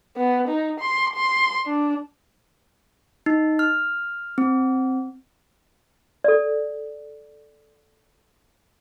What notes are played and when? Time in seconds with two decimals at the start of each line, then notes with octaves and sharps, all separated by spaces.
0.16 B3
0.48 D#4
0.80 C6
1.16 C6
1.66 D4
3.26 D#4
3.59 F6
4.38 C4
6.24 A4 D5